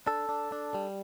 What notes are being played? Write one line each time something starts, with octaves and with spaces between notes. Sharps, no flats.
D4 A4
D4
D4
G3